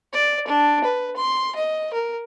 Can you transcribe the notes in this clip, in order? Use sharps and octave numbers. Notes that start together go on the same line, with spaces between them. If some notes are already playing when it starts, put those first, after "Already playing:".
D5
D4
B4
C6
D#5
A#4